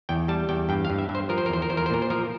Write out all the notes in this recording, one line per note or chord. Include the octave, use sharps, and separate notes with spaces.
E2 G5
G3 A5
E2 G5
G2 G5
F5
G2
E5
G2
C5
F3 A#4
C5
A#4
E2 C5
A#4
E2 C5
A#4
C5
A#2 A#4
C5
F3 A#4